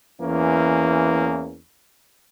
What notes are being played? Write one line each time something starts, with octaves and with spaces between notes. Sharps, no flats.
E2 E3 A#3 C#4